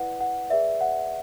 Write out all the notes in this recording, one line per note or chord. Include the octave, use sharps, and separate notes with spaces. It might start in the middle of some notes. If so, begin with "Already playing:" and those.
Already playing: E4 B4 D5 F#5
F#5
G#4 B4 D5 E5
F#5